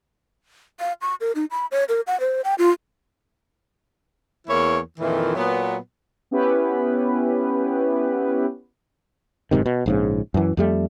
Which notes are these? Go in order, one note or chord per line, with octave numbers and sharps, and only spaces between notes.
F5
C#6
A#4
D#4
B5
C#5
A#4
F#5
C5
G5
F4
E2 E3 A#3 E4 C#5
F2 A#2 D#3 E3
A#2 F#3 B3
B3 C#4 E4 G4 B4
F#1 G#2 C3 D#3
B2
A#1 G#2 C#3
F#2 E3
F2 G3 A3